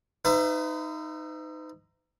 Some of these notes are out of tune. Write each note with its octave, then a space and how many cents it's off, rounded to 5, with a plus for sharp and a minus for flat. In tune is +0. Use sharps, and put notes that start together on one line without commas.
D#4 +0 B4 +45 E5 +30